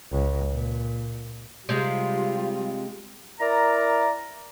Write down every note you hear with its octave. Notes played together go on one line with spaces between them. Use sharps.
C#2
A#2
C3 G3 G#3 F4
E4 A#4 D5 A#5